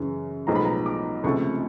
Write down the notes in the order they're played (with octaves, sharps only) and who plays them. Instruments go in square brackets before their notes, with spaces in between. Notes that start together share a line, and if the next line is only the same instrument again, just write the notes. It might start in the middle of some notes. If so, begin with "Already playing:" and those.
Already playing: [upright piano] F#2 C#3 E3
B1 A2 F3 G#3 B3 A#5
B5
A#5
D6
C#2 C3 F3 A3 C#6